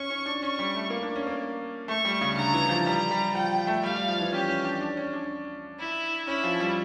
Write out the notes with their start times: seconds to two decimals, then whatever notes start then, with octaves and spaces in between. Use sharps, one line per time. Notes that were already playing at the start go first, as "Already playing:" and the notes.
Already playing: C#4 C#6
0.10 C#4
0.26 D4
0.41 C#4 C#6
0.59 G3
0.75 A3
0.90 A#3
1.03 D4
1.15 C#4
1.27 A#3
1.88 A3 C#6
2.05 G3
2.21 C#3
2.36 D3 A#5
2.54 E3
2.69 F3
2.85 G3 A#5
3.11 G3
3.34 F3 G5
3.67 A3
3.83 G3 F5
3.96 G3
4.08 F3
4.20 E3
4.32 C#4 G4
4.48 C#4
4.64 D4
4.81 D4
4.97 C#4
5.13 D4
5.78 E4
6.27 C#4 E4
6.44 F3
6.60 G3